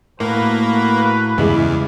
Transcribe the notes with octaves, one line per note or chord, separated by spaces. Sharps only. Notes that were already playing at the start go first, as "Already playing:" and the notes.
A2 A#3 F#4 B4
E2 G2 C#3 G3 G#3 E4